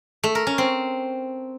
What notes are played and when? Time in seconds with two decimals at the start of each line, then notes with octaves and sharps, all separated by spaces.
0.23 A3
0.35 A#4
0.47 C#4
0.58 C4